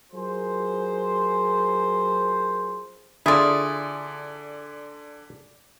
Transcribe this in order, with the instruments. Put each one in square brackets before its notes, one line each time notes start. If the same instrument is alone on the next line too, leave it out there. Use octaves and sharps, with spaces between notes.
[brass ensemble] F#3 F4 G#4 A#4 C5
[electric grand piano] D3 [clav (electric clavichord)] E4 F4 [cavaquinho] G#4 D5